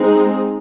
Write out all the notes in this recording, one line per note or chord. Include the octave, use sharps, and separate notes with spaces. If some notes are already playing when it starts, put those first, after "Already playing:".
Already playing: G#3 C4 D#4